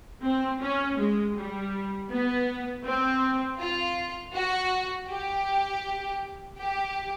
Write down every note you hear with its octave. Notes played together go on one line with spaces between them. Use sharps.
C4
C#4
G#3
G3
B3
C4
F4
F#4
G4
G4